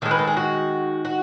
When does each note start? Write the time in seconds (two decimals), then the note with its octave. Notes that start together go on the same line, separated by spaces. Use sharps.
0.02 D#3 G#3 A4
0.11 B4
0.19 A4
0.27 G#4
0.37 F#4
1.05 F#4